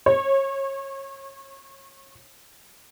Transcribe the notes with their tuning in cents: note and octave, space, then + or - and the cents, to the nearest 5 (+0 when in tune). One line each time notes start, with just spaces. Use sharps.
C#5 -25